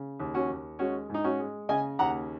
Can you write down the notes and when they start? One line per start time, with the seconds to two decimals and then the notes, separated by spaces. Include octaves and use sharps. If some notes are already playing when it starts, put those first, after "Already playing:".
Already playing: C#3
0.20 D#2
0.34 C#4 F#4
0.49 D#2
0.79 G#3 C#4 F#4
1.10 G#2 D#4
1.24 C#4 F#4
1.39 G#3
1.69 C#3 D#5 G#5
1.99 D#2 F#5 A#5